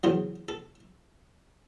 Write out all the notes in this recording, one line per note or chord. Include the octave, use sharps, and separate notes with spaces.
E2 C#3 F#3 C5
A4